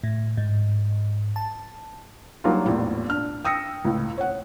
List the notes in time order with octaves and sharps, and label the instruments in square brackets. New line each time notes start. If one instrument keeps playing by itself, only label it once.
[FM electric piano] A2
G#2
A5
[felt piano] F#3 G3 A#3 D4 D#4 F4
A#1 E2 A2
D4 F6
G5 D#6 E6 A#6 C#7
C#2 A2
C#5 F#5